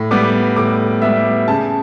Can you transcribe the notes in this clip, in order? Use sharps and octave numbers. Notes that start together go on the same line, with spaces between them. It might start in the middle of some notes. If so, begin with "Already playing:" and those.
Already playing: A2
G3 B3 D6
A2 D6
G3 B3 E5
C#3 A5